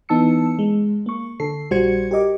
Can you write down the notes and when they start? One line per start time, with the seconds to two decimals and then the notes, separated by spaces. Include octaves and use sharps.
0.09 E3 B3 D#4 A5 E6 C#7
0.59 G#3
1.06 A#3 C#6
1.40 D3 A4 C7
1.71 A#1 G3 F#4 C5 G#6 C#7
2.11 G4 A#4 D#5 D6